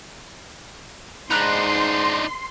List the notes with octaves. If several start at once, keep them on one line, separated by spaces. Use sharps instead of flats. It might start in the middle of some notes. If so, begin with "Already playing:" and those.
G#2 D4 D#4 B4 A#5 C6 F#6